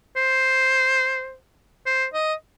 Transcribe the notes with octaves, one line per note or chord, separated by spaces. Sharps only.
C5
C5
D#5